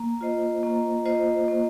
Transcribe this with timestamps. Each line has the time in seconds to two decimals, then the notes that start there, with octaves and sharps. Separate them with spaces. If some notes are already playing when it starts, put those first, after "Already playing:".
Already playing: A#3
0.21 F4 C5 D#5
0.63 A#3
1.06 F4 C5 D#5
1.48 A#3